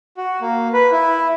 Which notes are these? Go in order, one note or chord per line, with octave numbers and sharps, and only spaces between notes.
F#4
A#3
B4
E4